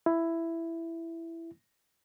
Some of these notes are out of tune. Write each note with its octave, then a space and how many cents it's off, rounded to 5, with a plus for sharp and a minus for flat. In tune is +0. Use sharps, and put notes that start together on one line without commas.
E4 +10